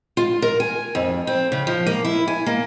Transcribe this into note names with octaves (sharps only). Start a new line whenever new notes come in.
F4
A#4
G#5
F2
C4
C#3
F3
A#3
E4
G#5
A#3